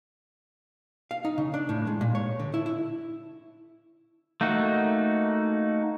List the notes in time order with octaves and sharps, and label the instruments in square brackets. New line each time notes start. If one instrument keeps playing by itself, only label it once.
[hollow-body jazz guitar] F5
D#4
C#3
D4
A2
G#3
A#2
C#5
D3
E4
E4
[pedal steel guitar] A3 A#3 D#4 F#4